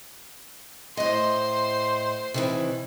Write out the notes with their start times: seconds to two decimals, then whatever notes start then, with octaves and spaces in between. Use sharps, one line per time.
0.97 A2 C5 D#5 C6
2.34 C3 D#3 E3